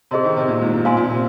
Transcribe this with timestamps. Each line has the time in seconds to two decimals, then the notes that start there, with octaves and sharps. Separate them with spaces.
0.11 C3 G#4 C5 D#5 C6
0.24 D#3
0.37 C3
0.48 A#2
0.61 G#2
0.73 G#2
0.85 A#2 C5 F5 G#5 C6
0.97 A#2
1.10 C3